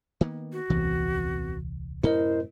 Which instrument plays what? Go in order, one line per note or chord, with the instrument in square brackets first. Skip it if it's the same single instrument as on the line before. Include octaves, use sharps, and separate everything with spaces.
[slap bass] D#3 A#3 B3
[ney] F#4
[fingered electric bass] D#1 C2 E3 [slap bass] F2 C3 B3
[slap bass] F#2 A2 C3 [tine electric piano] E4 A#4 D#5 [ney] C5